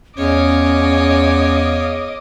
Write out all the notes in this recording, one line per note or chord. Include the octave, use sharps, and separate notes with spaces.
E2 C#4 C#5 D#5 F5 D6